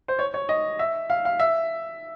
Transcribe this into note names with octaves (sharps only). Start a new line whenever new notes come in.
C5
C#5
C#5
D#5
E5
F5
F5
E5